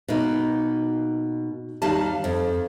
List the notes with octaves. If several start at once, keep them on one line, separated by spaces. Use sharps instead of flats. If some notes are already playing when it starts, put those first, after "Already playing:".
B2 A#3 D#4
D#2 D#3 G3 F5 A5
F2